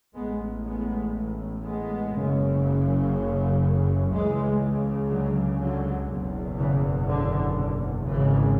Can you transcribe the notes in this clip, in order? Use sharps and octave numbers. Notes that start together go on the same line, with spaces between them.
A1 A2 G#3 B3
G#3 B3
G#3 B3
F#1 F#2 C#3
C#2 C#3 E3 G#3
D3 F#3
D3 F#3
F#1 E2 B2
C#3 E3
D3
G#1 G#2 C#3 E3